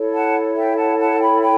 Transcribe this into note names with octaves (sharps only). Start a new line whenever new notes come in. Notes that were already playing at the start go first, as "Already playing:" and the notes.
Already playing: E4 A4 C#5
F#5 A5
E5 G5
F#5 A5
F#5 A5
G5 B5
G5 B5